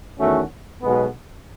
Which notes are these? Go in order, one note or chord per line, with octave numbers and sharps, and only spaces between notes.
E2 D#3 A3 C#4 F#4
B1 B2 G#3 B3